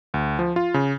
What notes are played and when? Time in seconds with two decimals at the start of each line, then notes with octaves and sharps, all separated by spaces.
0.14 D2
0.39 F3
0.56 F4
0.74 C#3